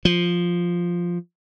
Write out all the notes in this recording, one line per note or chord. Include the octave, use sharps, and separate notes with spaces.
F3